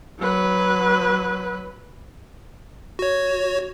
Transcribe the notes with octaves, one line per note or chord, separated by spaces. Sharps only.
F#3 B4
F#4 C#5